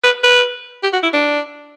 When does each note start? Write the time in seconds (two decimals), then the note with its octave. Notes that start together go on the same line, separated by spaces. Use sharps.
0.04 B4
0.24 B4
0.83 G4
0.93 F#4
1.03 E4
1.13 D4